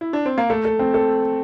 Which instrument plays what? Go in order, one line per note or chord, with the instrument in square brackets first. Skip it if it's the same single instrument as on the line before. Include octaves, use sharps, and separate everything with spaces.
[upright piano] E4
D4
C4
A#3
[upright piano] A3 [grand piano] A4
[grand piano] A4
C4
A4